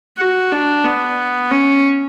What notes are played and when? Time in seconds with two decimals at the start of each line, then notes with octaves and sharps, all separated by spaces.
0.18 F#4
0.52 D4
0.85 B3
1.51 C#4